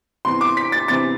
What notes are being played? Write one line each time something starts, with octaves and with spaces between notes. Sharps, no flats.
E2 C3 E3 C6
D6
B6
A6
E2 C3 E3 A6